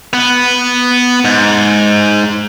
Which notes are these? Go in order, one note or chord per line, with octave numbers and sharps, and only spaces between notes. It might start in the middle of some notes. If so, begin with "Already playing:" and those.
B3
G#2